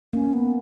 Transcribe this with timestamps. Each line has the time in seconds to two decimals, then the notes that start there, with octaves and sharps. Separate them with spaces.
0.13 A#3 C#4
0.33 B3